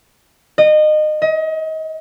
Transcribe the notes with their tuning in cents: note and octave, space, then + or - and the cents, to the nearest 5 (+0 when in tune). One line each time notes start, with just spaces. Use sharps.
D#5 -25
D#5 +30